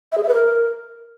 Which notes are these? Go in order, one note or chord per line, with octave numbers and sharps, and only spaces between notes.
E5
G#4
E5
B4
A#4